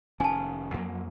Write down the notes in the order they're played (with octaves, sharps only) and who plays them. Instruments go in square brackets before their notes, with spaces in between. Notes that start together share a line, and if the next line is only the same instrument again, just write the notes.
[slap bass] F1 D#3 C#4 [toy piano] G#5 A5
[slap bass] F2 F#3 A#3